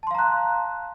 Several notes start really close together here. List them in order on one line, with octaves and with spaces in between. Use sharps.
A5 C6 F5 A#5 F#6